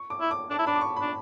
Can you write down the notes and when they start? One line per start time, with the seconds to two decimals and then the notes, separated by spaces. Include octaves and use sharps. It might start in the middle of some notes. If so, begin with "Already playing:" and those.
Already playing: C#6
0.10 D6
0.21 E4
0.31 D6
0.50 D4 A5
0.59 E4
0.66 D4 B5
0.76 D6
0.81 C#6
0.96 D4 B5